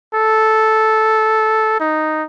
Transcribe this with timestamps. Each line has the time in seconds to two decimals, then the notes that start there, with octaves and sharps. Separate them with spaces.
0.15 A4
1.80 D#4